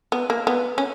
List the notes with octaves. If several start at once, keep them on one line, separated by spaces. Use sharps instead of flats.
B3
A#3
B3
C#4